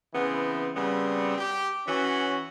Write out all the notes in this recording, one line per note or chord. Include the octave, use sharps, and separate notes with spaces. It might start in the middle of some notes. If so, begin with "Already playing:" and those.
C#3 E3 B3 C4
C#3 G3 B3 C4
G4
E3 C#4 F#4